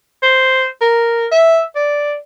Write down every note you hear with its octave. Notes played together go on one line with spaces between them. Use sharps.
C5
A#4
E5
D5